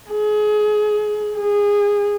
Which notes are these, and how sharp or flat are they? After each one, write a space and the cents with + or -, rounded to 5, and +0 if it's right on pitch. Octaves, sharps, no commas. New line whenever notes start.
G#4 +25
G#4 -20